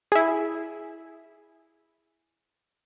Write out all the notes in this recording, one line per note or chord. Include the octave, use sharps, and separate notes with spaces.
E4 G#4